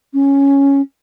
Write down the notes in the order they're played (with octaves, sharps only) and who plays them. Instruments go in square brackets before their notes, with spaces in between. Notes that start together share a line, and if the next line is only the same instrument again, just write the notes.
[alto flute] C#4